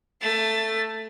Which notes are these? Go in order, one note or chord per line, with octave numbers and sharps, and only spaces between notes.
A3 A6